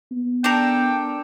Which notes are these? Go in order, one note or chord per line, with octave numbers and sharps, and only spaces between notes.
B3
D4 A4 A#4 G5